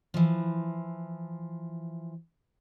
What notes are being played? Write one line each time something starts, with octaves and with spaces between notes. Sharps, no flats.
E3 F3